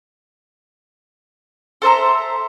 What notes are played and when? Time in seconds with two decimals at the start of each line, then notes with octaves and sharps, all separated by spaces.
1.82 A4 C5 E5 A#5